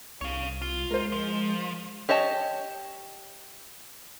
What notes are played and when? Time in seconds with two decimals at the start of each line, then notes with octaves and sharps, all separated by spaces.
0.21 C2 C#5 F5
0.62 F4
0.91 G#3 A#4 C5
1.12 F3
2.09 G4 C#5 D#5 A5